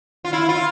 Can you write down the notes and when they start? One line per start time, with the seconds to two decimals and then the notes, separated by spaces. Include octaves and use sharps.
0.25 F4
0.33 E4
0.49 F4